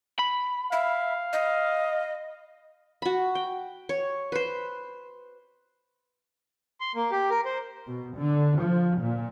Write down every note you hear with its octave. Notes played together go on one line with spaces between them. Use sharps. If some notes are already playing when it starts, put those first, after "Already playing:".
B5
E5 F5
D#5
F#4 B5
G5
C#5
B4 C5
C6
A#3
G4
A#4
C5
B2
D3
F3
A#2